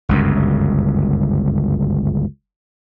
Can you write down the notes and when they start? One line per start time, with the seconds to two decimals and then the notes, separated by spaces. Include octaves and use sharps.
0.09 G1 C#2 F#2